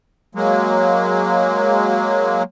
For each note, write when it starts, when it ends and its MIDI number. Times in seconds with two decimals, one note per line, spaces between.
0.35 2.43 54
0.35 2.43 56
0.35 2.43 58